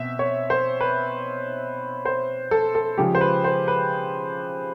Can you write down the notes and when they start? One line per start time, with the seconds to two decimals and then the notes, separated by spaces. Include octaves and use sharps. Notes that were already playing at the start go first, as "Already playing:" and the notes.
Already playing: B2 C4 E5
0.19 C#5
0.50 C5
0.81 B4
2.05 C5
2.51 A4
2.75 A4
2.97 C#3 F3 G#3 G4
3.15 C5
3.21 B4
3.44 C5
3.68 B4